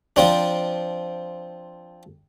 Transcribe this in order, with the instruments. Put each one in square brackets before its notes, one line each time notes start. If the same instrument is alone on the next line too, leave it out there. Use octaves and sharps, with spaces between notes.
[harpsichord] F3 C4 D4